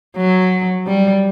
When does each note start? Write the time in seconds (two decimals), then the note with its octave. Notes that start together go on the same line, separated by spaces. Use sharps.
0.17 F#3
0.87 G3